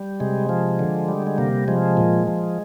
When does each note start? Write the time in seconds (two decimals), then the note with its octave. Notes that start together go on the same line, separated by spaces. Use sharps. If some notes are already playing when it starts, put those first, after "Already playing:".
Already playing: G3
0.20 C3 G#3
0.49 F3
0.79 D3
1.08 G3
1.27 G#3
1.38 C3 A#3
1.68 F3 G#3
1.97 A#2
2.27 F3